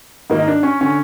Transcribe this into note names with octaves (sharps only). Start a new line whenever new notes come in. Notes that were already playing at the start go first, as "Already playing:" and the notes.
G#2 D#3 A#3
D#4
D4
C#4
D3 C#4